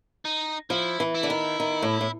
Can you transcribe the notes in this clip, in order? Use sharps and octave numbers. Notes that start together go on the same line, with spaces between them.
D#4
F3 E4
E3
E4
D3
D#3
D#3
A2
A2